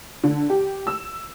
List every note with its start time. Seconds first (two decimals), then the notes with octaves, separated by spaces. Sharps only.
0.24 D3
0.50 G4
0.87 E6